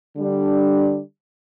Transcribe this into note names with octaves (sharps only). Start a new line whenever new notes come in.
D3 G3 D4